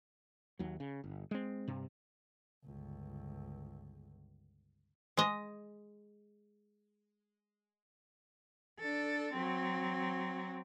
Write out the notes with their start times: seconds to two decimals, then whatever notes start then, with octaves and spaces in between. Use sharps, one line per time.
0.59 D#2 F#3
0.80 C#3
1.04 G1
1.31 G#3 C4
1.68 G2 C3
2.65 G1 C#2
5.17 G#3 D#5
8.80 D4 A4
9.33 F#3 C4